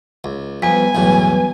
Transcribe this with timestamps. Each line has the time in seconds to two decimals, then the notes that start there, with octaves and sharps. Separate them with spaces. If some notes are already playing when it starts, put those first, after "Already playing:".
0.24 C#2
0.62 F2 G3 B3 B4 G#5
0.95 B1 E2 A2